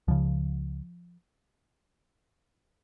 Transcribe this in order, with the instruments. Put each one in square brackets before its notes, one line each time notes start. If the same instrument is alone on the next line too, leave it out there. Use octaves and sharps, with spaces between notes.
[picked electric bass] C#2 C#3 F3